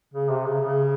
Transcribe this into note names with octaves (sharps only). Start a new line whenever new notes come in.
C#3
C3
C#3
C#3